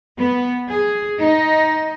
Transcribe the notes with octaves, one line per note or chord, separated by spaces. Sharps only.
B3
G#4
D#4